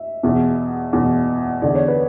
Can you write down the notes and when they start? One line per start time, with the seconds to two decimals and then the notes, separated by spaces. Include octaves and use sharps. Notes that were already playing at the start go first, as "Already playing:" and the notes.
Already playing: E5
0.23 E2 B2
0.93 E2 B2
1.62 E2 D3 D5
1.75 C#5
1.88 B4